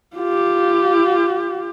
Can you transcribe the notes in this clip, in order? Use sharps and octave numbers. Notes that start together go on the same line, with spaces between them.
F4 G4